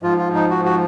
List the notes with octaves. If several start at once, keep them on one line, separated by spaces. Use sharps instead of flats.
G#2 F3 F4
F4
D#4
F#4
F#4